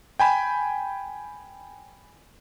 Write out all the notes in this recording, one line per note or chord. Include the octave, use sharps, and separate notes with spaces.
G5 G#5 B5